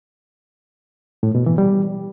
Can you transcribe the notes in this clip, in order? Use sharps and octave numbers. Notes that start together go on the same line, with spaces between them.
A2
B2
E3
G3